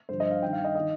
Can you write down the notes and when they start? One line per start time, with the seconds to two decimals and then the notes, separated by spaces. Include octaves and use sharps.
0.09 G2 D3 F3 C5
0.20 D#5
0.31 F5
0.42 G2 D#3 G5
0.53 F5
0.64 D#5
0.75 D#3 D#5